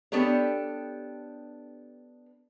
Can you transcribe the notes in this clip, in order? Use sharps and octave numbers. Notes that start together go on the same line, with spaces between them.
B3 D4 G4 A4 C#5